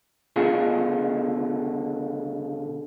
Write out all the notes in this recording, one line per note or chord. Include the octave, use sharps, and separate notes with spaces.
C#2 B2 D3 F4 G#4